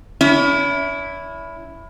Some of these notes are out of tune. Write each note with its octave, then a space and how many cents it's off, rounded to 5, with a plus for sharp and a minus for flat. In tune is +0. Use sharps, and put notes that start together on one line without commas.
C#4 +40 E4 +0